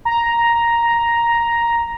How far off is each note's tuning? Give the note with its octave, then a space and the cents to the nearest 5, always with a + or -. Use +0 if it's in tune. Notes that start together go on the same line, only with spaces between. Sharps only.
A#5 +5